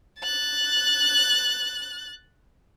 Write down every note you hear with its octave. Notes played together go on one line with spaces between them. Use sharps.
F#6 A6